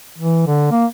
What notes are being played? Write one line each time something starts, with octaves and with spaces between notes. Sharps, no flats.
E3
D3
A#3